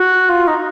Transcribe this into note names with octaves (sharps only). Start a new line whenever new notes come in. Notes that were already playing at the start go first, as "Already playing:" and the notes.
Already playing: F#4
F4
D#4